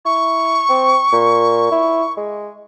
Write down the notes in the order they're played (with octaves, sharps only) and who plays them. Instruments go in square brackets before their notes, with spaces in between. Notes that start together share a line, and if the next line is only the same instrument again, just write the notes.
[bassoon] E4 [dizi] C#6
[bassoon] C4
A#2
E4
G#3